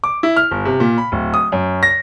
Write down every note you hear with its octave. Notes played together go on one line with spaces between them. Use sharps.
D6
E4
F6
G1
C3
A#2
B5
D1
D#6
F#2
A#6